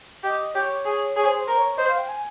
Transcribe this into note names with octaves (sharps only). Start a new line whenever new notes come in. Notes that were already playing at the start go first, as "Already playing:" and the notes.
G4 D#5
G4 C#5
G#4
G#4 C#5
C5
C5
A#4 C5
C#5
C#5
C5 D#5
F5
G5
G#5